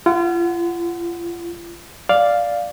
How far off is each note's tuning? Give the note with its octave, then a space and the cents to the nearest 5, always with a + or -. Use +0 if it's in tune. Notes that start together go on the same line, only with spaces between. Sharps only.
F4 -35 F#5 +0
D5 +0 F5 +0